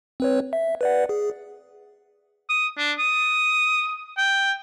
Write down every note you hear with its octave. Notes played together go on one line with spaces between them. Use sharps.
C4 B4 C#5
E5
B4 D5 F#5
G#4
D#6
D4
D#6
G5